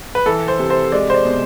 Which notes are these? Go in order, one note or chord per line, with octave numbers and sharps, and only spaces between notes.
B4
E3 A4
C5
C3
C5
G#3 D5
C5
D5
B2